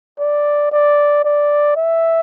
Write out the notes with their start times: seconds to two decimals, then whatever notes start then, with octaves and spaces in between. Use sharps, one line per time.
0.19 D5
0.72 D5
1.24 D5
1.76 E5